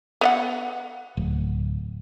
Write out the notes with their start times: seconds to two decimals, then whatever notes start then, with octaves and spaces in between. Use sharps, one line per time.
0.21 B3 D#5 F#5
1.17 D1